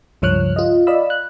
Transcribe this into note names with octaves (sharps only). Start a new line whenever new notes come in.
C#2 G2 F3 C#5 F6 F#6
F4 D#5
D5 D#5 F5 B5 E6
F#6